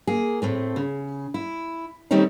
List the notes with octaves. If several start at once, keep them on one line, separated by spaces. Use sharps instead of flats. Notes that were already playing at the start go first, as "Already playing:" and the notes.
A#3 G#4
A2 A3 C4
C#3
E4
D#3 G3 A3 C4 C#4 D#4